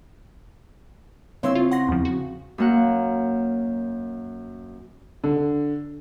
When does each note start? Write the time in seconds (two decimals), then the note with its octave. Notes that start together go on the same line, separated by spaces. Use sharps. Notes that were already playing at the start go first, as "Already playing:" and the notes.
1.43 C#3 C4 E4 C#5 C6 E6
1.55 F4
1.72 F#5 C6 A#6
1.89 E2 F3
2.05 F#4
2.58 F#2 A#3 F#5
5.24 D3